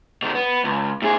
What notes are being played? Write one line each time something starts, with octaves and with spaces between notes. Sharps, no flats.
B2 D#3
B3
C#2
A2 G#4